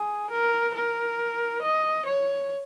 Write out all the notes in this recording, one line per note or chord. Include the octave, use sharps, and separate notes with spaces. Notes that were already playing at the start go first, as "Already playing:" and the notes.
Already playing: G#4
A#4
A#4
D#5
C#5